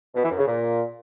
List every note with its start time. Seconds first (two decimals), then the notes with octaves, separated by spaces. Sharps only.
0.15 B2
0.22 E3
0.30 F#2
0.38 C#3
0.45 A#2